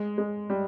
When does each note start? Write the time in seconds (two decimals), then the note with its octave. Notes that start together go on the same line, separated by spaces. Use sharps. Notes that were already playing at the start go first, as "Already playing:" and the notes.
Already playing: G#3
0.18 G#3
0.50 G3